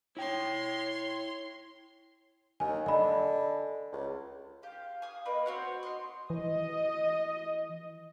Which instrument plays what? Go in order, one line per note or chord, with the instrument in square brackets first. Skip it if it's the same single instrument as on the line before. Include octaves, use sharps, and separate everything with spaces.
[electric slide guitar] E4 G5 [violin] C#5 C6
[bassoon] D#2 [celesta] G#5
[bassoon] D3 [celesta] D#5 B5
[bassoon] C#2
[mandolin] G4 [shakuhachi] F5
[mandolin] G#5 D#6
[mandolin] A#3 B4 [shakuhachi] D#5
[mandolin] C4 C#5 F#5 [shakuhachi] F#4
[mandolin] D#5 C6
[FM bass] E3 [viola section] D#5